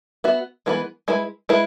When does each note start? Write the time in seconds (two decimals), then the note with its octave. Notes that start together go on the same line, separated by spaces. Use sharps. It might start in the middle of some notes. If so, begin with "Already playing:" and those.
0.24 B3 F#4 E5
0.66 E3 G#3 B3 B4
1.08 G#3 E4 B4
1.49 G#3 E4 B4